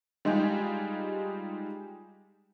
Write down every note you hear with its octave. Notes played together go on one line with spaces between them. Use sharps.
G3 G#3 D#4 F4 G4 G#4